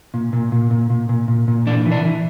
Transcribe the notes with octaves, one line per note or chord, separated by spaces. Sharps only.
A#2
A#2
A#2
A#2
A#2
A#2
A#2
A#2
E3 D4
E3
D4
E3